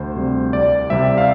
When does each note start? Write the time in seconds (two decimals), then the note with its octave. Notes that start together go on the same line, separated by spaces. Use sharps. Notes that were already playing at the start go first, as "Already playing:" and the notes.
Already playing: D2 C5
0.16 C3 G3 C4
0.53 C2 D5
0.90 C3 G3 C4 E5
1.18 F5